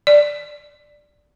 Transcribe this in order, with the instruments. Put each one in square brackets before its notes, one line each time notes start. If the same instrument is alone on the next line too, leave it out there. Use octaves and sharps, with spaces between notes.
[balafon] D5